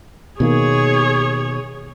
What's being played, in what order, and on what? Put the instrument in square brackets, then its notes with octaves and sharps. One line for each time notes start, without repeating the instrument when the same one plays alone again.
[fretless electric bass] B2 D#3 A#3 [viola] G#4 C#5